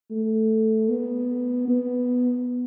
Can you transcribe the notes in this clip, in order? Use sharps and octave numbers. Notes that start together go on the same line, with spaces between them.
A3
B3
B3